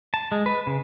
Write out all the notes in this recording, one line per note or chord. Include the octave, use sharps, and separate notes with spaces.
A5
G#3
B4
C#3